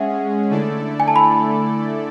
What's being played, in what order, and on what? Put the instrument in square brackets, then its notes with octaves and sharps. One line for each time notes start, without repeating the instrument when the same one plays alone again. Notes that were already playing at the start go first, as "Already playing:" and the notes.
Already playing: [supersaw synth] G#3 C#4 G#4 [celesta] E5 F#5
[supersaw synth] D3 A3 E4 A4 D5
[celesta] G#5
A5
B5